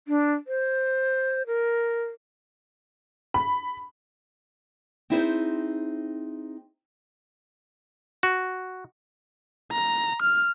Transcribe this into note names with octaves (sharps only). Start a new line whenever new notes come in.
D4
C5
A#4
B5
C4 D#4 E4 G#4 B4 C5
F#4
A#5
F6